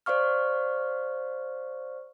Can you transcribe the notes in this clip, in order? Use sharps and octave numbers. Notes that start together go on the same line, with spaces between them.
C5 D5 F5 C#6 F6